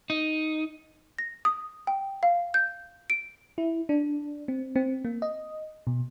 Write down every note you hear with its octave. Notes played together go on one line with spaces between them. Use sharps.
D#4
A#6
D#6
G5
F5
G6
D7
E4
D4
C4
C4
A#3
D#5
B2